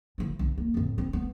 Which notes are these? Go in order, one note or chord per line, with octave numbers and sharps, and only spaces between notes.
F3 E4
B1 G2
A#3
F2 A2
C4
G#3 B3